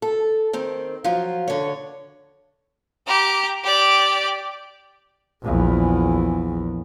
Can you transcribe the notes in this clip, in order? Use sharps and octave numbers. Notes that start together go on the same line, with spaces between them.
A4
D#3 C4
F3 F#3 F4
D3 C#5
G4 A#5
G4 D5
A#1 E2